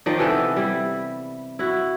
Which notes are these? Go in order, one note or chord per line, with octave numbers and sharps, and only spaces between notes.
D#3 F3 D#4 D5
C3 E3 B3 A4
G3 E4
E4 F#4